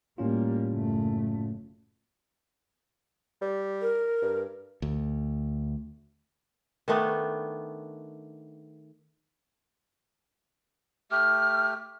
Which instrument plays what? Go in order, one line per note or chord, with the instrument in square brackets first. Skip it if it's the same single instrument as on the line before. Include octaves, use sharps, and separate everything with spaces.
[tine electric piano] A2 C#4 F4 [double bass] G3 A#3
[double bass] F#1 A3
[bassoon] G3
[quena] A#4
[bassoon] G2
[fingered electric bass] D2
[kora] D#3 A3 B3 D4
[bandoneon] A3 G4 [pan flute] F6